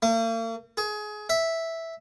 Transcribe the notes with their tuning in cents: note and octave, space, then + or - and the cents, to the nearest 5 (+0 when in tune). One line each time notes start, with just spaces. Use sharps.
A#3 -45
G#4 +25
E5 -5